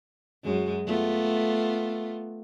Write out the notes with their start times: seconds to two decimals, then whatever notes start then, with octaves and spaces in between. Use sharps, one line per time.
0.44 F#2 G#3
0.86 A3 B3 F4